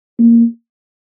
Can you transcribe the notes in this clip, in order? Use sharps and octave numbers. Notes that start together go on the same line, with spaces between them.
A#3